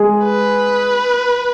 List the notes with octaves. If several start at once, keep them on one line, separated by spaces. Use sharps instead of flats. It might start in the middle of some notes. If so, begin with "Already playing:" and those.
Already playing: G#3 G#4
B4